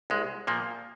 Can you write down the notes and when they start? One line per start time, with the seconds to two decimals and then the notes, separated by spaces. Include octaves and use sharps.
0.10 C2 G#3
0.47 A#2 F3 A#3